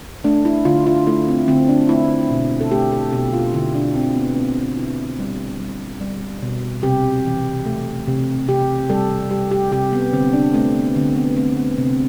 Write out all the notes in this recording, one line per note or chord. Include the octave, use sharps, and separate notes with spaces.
A3 D4
E4
D3 F4
F4
A3 E4
C4
D3 C4
D4
A3 E4
B2
A4
A3 G4
A4
B2 G4
F4
D3 E4
D4
D3 C4
B3
A3 C4
D3 E4
G3
G3
G3
B2
C3 G4
E3
A3
C3
C3 G4
G3 A4
G3 G4
G4
C3 G4
B3
D3 C4
D4
A3 C4
B3
D3 C4
B3
A3 C4
B3
C3 C4